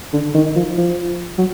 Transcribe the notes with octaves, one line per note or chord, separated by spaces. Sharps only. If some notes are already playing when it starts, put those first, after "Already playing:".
D3
D#3
F3
F3
F#3